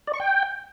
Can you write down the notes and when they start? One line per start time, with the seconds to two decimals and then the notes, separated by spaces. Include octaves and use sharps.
0.07 D5
0.14 C#6
0.20 G5